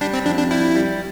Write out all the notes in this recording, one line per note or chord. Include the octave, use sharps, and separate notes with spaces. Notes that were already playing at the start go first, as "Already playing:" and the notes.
G3 D4
C4
F2 D4
D4
G3 E4
G3